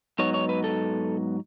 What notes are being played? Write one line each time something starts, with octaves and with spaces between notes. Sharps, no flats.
G#2 F#3 B3 D#4 C#5
C#5
B4
A4